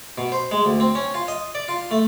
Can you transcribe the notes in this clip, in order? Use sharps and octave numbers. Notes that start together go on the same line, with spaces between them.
B2
C5
G#3
D2
C4
C#4
F4
D#5
D5
F4
A3